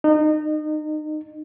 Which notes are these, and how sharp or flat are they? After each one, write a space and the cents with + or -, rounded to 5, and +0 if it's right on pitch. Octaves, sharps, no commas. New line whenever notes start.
D#4 -30